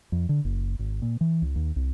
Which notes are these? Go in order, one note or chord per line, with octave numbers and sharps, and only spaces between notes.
F2
D3
F#1
G#1
A#2
E3
C#2
D#2
C2